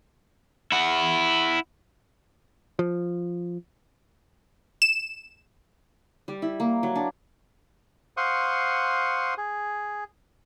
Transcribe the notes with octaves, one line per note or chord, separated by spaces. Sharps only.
E4 F#5
F3
E7
G3
E4
A#3
F#3
D4
C5 F5 F#5 C6 C#6 D#6
G#4